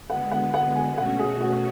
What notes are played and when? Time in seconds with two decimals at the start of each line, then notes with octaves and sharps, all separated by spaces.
0.09 D3 G#3 B3 F#5
0.32 F#5
0.54 F#5
0.75 G#5
0.97 B2 A3 C#4 F#4 F#5
1.19 G#4
1.41 F#4